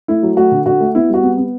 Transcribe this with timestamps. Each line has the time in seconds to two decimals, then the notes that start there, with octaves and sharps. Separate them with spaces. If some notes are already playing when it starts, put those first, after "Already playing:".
0.08 A3 E4
0.23 F#3
0.37 A3 F#4
0.52 D3
0.66 D3 F#4
0.80 A3
0.95 B3 E4
1.09 G3 F#4
1.23 B3
1.37 B3